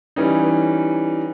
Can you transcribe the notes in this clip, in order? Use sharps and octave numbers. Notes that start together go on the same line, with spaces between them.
E3 G3 C#4 D#4